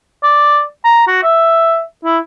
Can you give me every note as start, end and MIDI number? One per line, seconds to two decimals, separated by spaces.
0.23 0.62 74
0.84 1.04 82
1.07 1.19 66
1.23 1.81 76
2.05 2.18 64